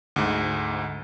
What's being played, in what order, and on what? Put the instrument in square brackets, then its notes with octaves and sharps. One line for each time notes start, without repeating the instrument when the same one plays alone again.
[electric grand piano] D2 G#2